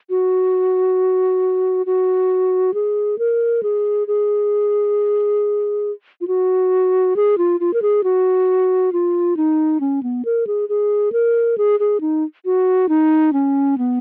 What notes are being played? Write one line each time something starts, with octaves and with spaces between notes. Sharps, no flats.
F#4
F#4
G#4
A#4
G#4
G#4
F4
F#4
G#4
F4
F4
A#4
G#4
F#4
F4
D#4
C#4
B3
A#4
G#4
G#4
A#4
G#4
G#4
D#4
F#4
D#4
C#4
B3